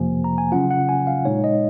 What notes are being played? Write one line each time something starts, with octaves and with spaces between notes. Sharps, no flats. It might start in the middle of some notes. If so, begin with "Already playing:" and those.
Already playing: F2 C3 F3 A#3 G#5
A#5
G#5
C#3 F#3 C#4 F4 F#5
F#5
G#5
F5
A#2 G#3 D#4 C#5
D#5